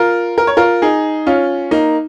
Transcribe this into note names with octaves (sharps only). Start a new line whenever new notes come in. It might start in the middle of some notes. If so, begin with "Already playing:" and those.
Already playing: F4 A#4
A#4
C#5
F4 A#4
D#4 G#4
C#4 F4
A#3 D#4